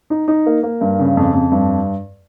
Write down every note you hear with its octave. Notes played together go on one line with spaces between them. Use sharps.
D#4
D#4
A#3
A#3
G2
C#3
F2
F2
G2